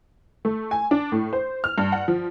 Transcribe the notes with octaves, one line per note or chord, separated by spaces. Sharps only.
A3
G#5
D4
A2
C5
F6
G2
F#5
F3